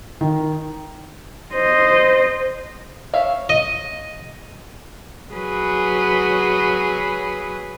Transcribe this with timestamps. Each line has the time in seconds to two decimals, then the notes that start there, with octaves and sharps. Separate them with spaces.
0.21 D#3
1.54 C5 D#5
3.14 C#5 E5 F5
3.49 D#5
5.33 F#3 G#4 B4